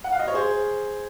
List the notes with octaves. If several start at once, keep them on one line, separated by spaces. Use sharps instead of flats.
F#5
F5
D#5
C#5
G#4 C5